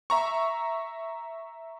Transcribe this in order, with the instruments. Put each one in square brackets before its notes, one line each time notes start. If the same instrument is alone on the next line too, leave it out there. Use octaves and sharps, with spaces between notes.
[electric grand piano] E5 A#5 C#6